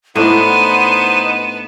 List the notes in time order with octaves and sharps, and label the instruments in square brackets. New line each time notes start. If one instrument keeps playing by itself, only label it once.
[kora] A2 D4 [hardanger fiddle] B3 A5 [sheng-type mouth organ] D#4 C5 F#5 [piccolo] D#7